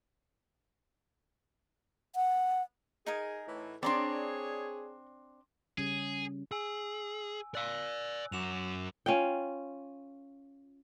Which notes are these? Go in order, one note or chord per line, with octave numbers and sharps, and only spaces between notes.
F#5
D#4 G#4 A#4 G#5
A2 E3
C4 D4 G#4 C#5 D5 A#5 C6
C#3 G3 C#4 G#4
G#4 G#5 E6
D5 F5 E6 F#6
F#2 F#4 D6 E7 F7
C#4 F4 G5